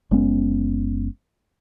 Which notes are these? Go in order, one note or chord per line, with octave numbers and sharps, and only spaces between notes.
F#1 G#3 B3 C#4